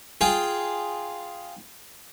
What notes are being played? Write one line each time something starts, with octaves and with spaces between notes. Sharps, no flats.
F4 G#4 G5 G#5